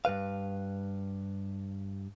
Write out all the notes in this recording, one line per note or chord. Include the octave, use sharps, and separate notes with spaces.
G2 C#3 B4 F5